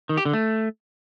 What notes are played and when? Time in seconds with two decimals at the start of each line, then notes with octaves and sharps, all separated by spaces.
0.09 D#3
0.17 G4
0.25 D3
0.33 A3